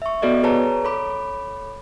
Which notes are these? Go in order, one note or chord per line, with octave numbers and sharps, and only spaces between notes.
E5 C#6
B3 F#4 A4 D5 D#5
G#4 B4 C#5 A5 A#5
A4 C#5 B5 D6